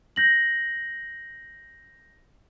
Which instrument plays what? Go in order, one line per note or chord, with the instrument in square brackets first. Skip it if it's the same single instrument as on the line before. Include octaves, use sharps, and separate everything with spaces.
[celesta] G6 A#6 F#7